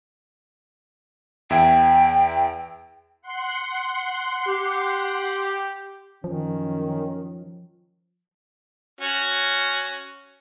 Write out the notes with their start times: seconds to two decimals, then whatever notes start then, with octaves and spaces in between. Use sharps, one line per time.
1.50 E2 E5 G5 G#6
3.22 F#5 C6
4.46 G4
6.24 F#2 D#3 F3 C#4
9.01 C#4 F#4